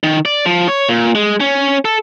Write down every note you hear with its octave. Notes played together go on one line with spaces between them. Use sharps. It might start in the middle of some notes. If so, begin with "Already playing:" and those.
D#3
D5
F3
C#5
A#2
G#3
C#4
A4